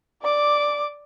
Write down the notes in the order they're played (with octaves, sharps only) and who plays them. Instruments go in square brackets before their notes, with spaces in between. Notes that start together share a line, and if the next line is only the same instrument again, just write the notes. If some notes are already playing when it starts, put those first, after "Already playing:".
[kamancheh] D5 D6